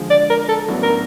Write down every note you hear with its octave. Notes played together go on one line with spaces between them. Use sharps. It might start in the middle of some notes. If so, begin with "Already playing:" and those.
Already playing: D3 F3 G#3
D5
A#4
A4
A1 A2 F#3 B3 D4
A#4